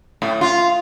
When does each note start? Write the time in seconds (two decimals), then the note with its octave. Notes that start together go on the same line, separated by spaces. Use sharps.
0.22 A2
0.41 F4